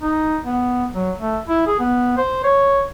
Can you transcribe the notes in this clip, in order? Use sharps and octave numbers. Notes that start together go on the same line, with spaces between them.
D#4
B3
F#3
A3
E4
G#4
B3
C5
C#5